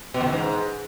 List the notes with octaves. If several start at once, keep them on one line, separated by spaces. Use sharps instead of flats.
B2
E2
E3
G#2